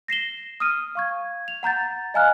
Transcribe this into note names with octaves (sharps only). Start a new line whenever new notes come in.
A#6 C7 E7 G7
D#6 F6 D#7
F5 C#6 G#6
F7
F#5 A#5 G6 A6
D#5 F5 G#5 A#5 F6 F#6